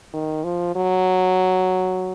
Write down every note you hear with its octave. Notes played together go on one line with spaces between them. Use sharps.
D#3
F3
F#3